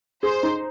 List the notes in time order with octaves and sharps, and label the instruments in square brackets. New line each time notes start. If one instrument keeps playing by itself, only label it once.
[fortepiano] G#4 [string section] C5
[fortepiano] D#4